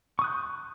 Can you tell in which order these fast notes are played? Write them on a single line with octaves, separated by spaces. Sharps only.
C#6 D#6 F#6 G6